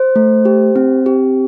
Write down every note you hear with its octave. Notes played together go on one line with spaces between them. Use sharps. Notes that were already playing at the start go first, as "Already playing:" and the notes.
Already playing: C5
A3
G4
C4
G4